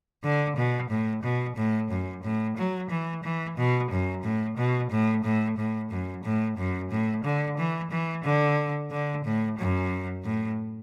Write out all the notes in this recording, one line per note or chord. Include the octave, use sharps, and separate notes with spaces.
D3
B2
A2
B2
A2
F#2
A2
F#3
E3
E3
B2
F#2
A2
B2
A2
A2
A2
F#2
A2
F#2
A2
D3
E3
E3
D3
D3
A2
F#2
A2